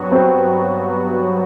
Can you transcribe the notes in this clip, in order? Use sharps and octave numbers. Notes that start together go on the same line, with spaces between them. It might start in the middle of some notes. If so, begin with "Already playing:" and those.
Already playing: G2 F#3 B3 F#4
C4